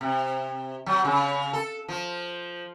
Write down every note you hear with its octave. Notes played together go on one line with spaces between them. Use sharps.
C3
F#3
C#3
A4
F3